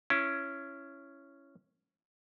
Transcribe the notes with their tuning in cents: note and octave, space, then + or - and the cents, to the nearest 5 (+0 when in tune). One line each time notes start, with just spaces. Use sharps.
C#4 +0 E4 +20